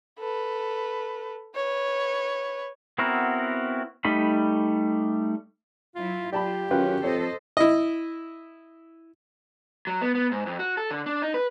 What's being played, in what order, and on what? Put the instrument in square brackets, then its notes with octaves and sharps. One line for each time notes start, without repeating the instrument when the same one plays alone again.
[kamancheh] A4 B4
B4 C#5
[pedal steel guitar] B3 C4 E4 F#4 A#4
G3 A3 D#4 B5
[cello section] F#3 E4 [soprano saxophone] F4
[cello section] F4 [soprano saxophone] G4 [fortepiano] D5 A5 B5
[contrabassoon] F#2 [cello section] D#3 C#4 [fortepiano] F4 B4 G5
[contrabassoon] F2 [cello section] A4 C5 D#5 [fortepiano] C#5
[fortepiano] E4 D#5
[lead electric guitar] F#3
B3
B3
G#2
F2
F#4
A4
D3
D4
D#4
B4